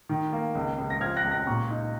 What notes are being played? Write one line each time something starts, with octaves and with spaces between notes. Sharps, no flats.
D#3
A#3
C#2
C#2
A#6
F3 F6 G#6
F#6 A#6
C#2
F#6 A#6
A#2 A#5 C#6
D#4